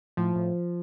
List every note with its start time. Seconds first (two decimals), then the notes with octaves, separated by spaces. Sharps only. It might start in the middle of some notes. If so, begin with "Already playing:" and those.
0.17 A2 F3
0.36 A2